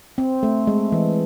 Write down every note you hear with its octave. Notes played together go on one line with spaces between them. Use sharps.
C4
A3
G#3
E3